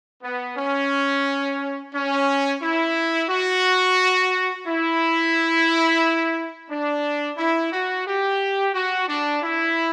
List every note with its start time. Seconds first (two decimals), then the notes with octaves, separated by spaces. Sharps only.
0.23 B3
0.57 C#4
1.94 C#4
2.62 E4
3.29 F#4
4.66 E4
6.69 D4
7.37 E4
7.73 F#4
8.06 G4
8.74 F#4
9.08 D4
9.43 E4